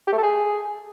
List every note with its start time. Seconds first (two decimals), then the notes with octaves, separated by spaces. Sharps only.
0.07 G4
0.13 A3
0.18 A4
0.23 G#4